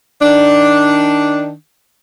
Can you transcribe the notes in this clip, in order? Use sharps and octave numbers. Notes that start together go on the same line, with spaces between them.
D#3 D4